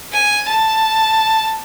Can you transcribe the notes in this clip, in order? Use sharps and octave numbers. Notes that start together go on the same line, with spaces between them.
G#5
A5